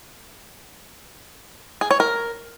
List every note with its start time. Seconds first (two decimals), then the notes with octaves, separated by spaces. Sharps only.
1.81 G#4
1.91 C#5
2.00 A#4